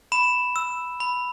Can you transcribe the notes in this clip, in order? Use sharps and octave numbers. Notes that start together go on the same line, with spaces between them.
B5 E7
E6
B5